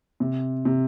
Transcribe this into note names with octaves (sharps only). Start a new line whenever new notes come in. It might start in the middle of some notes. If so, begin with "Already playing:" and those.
C3
C3